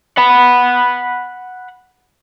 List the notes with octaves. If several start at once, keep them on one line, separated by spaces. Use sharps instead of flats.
F#5 B5